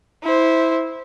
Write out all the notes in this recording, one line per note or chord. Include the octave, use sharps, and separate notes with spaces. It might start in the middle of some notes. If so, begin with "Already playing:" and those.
E4 C5